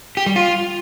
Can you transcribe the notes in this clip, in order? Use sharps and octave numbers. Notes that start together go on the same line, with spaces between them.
G4
G3
F4